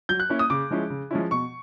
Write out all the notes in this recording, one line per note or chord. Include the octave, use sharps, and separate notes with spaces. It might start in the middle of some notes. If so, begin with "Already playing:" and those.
F#3 G6
F#6
A#3 C#4 E4
D#6
C#3 D6
F3 G#3 C#4 E4
C#3
F3 G#3 C#4 E4
B2 C#6